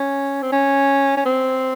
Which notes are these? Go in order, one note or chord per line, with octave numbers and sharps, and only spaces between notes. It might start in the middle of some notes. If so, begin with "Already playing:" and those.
Already playing: C#4
C4
C#4
C#4
C4